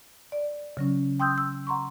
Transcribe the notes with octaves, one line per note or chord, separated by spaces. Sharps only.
D5
C#3 F#3 C#4
G5 C6 D#6 E6 G6
E6
F#5 A#5 C6 C#6